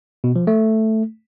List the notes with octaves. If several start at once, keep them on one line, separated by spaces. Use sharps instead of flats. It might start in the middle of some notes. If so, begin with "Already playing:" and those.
B2
F3
A3